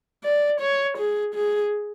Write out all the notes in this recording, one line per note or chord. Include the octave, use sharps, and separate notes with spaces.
D5
C#5
G#4
G#4